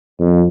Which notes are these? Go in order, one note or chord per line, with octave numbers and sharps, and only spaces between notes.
F2